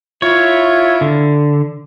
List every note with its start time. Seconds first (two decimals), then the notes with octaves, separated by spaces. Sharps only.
0.22 E4 F4 C#5
1.01 D3